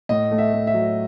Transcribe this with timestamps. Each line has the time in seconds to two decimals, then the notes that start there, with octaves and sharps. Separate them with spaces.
0.09 A2 D#5
0.31 A3
0.38 E5
0.53 A3
0.67 E5
0.74 F#3